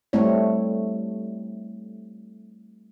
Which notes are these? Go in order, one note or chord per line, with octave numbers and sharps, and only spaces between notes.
G3 A3 C4 E4 C#5